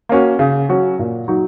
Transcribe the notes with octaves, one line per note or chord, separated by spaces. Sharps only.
A#3 C#4 F#4
C#3
F#3 C#4 F#4
A#2
F#3 D#4 F#4